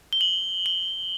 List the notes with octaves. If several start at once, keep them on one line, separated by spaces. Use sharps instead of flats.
G7
F#7
G7